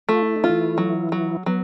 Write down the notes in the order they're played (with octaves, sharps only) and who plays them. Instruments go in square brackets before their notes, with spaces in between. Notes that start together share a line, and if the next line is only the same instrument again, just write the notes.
[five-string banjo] A3 [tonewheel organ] F4
[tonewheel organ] E4
D#4
[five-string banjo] F4
[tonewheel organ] E3 E4
[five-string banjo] F#3
F#3
[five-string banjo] F#3 [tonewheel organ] B3